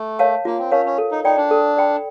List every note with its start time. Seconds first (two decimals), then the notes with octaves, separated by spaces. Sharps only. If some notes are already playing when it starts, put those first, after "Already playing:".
Already playing: A3
0.19 A#4 C#5 F5 A5
0.45 A#3 F4
0.59 C4
0.71 C#4 A#4 C#5 F5 A5
0.86 C#4
0.98 A4
1.12 D#4
1.24 D#4 D5 G5 B5
1.37 D4
1.51 A4
1.77 D5 G5 B5